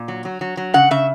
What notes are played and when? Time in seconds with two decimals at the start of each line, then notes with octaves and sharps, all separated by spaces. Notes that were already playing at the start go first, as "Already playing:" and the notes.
Already playing: A#2
0.08 F#3
0.25 F#3
0.41 F#3
0.57 F#3
0.74 C#3 F#5
0.91 C#3 E5